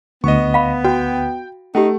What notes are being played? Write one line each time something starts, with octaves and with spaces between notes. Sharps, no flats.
D2 B3 D#5 C#6
F5 B5
F#4 G5
A3 C#4 D#4 G4